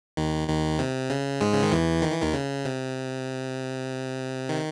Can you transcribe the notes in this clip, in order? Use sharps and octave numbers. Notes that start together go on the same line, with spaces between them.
D#2 D#3
D#2 D#3
C3
C#3
G#2 G#3
C#3
D#3
E2 E3
D#3
E3
D#2 D#3
C#3
C3
D#3